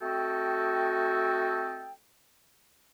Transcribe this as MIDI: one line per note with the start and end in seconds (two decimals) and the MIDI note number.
0.02 1.92 57
0.02 1.92 60
0.02 1.92 66
0.02 1.92 69
0.02 1.92 75
0.02 1.92 79